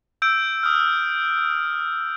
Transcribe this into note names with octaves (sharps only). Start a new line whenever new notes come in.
E6 G6 D7
D#6 F6